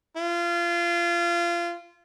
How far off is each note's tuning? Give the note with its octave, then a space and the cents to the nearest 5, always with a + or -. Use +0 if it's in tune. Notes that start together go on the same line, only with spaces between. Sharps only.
F4 -25